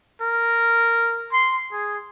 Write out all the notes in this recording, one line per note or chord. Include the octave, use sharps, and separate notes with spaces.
A#4
C6
G#4